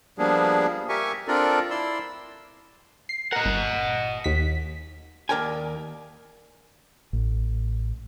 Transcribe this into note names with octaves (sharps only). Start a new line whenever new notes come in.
F3 G3 A#3 B3 D4 G#4
G4 A#4 E5 G#5 C#6
C4 D4 F4 A4 A#4 D5
E4 D5 C6 E6
C7
A#4 D#5 F#5
G1
D#2 B6
D#2 A#4 D5 G5 G#5
A1